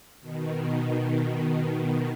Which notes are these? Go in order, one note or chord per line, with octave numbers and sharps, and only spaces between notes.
B2 D#3